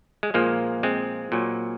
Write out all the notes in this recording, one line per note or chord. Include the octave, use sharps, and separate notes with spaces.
G#3
A#2 F3 G#3 A#3
G#3 C4
A#2 F#3